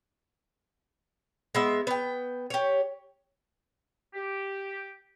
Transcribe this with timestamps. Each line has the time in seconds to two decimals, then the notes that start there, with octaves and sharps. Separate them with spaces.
1.55 G#3 B3 E5
1.87 B3 G5
2.50 G4 C#5
4.14 G4